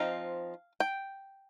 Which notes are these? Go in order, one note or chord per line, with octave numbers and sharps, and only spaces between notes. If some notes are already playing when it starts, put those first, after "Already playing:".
Already playing: F3 C4 D#4 F5
G5